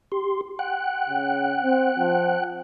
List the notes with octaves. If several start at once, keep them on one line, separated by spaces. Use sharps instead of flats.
G4 C6
F#5 G5 F#6
C#3
C4
F3